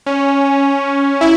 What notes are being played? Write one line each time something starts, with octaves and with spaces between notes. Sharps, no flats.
C#4
E4